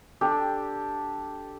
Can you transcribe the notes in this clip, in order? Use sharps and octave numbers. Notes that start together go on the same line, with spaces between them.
D4 G4 A4